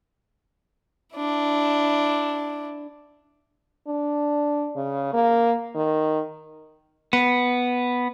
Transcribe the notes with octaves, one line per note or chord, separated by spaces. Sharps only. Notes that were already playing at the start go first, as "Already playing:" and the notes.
D4 E4
D4
C#3
A#3
D#3
B3